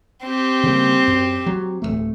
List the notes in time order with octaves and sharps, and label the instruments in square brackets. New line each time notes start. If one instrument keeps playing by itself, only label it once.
[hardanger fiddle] C4 G4
[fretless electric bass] C#3 G3 A#3
F#2
F#3
D1 D#2 A3